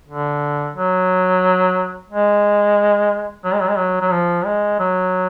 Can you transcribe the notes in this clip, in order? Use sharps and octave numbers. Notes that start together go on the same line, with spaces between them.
D3
F#3
G#3
F#3
G#3
F#3
G#3
F#3
F#3
F3
G#3
F#3